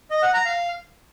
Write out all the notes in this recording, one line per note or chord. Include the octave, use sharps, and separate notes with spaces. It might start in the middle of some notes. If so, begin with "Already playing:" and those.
D#5
F#5
A#5
F5